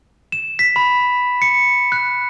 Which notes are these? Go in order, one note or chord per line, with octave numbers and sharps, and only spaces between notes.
E7
B6
B5
C#7
F#6